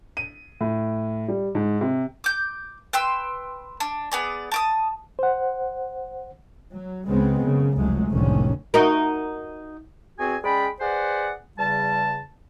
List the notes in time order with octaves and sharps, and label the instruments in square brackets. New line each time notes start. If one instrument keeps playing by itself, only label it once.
[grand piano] D#7
A2
G3
G#2
C3
[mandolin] D6 G6
B4 G5 C6 E6
D4
B3 G#4 D5
A5 D6 D#6
[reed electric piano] C5 F#5
[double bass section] F#3
C#2 C#3 G#3 B3 C4
F#2 C#3
F1 C#2 F#3 G#3 A3
F1 C2 A2 D3 D#3 C#4
[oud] D#4 F#4 A#4
[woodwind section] E2 C4 F#4 G#4 G#5
G#3 C#4 D5 G5 B5
G#4 B4 C5 D5 F#5
E2 C#3 G3 A5